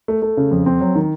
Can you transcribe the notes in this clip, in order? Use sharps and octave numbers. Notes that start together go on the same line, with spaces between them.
A3
A3
C#3
F2
C4
F#3
D#3